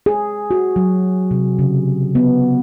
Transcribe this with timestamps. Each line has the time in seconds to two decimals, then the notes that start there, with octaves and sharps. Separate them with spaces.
0.06 G#4
0.51 F#4
0.76 F#3
1.31 C3
1.59 C#3
2.15 B3